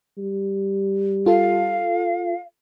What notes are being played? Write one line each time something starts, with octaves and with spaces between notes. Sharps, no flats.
G3
F4 A4 F5